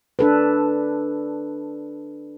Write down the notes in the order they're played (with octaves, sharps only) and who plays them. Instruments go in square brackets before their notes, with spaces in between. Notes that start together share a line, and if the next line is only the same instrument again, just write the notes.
[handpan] D4 A4 B4